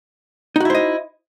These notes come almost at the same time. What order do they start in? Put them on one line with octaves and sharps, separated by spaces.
D#4 F#4 E4 C5 D#5